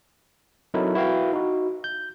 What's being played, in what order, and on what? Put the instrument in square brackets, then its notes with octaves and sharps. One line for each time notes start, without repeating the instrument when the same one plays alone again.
[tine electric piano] F#3 C4 D#4 E4 A4 A#4
E4 F#4 B4 F5 G5
D#4 F#4
G6